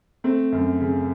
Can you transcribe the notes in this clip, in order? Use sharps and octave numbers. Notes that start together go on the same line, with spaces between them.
A3 C4
F#2
C#3